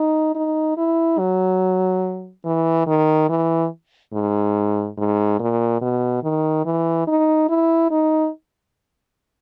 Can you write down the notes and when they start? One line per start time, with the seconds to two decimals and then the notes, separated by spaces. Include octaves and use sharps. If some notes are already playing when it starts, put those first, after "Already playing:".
Already playing: D#4
0.35 D#4
0.77 E4
1.18 F#3
2.45 E3
2.87 D#3
3.29 E3
4.13 G#2
4.98 G#2
5.39 A#2
5.81 B2
6.23 D#3
6.65 E3
7.07 D#4
7.49 E4
7.91 D#4